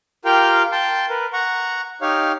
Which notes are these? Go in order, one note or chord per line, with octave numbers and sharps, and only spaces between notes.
F4 G4 A#4 F5 G5
G5 A5 C6
A#4 B4
F#5 A#5 C#6
D#4 G4 C#5 F5